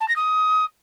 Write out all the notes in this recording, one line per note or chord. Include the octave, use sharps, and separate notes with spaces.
A5
A#6
D#6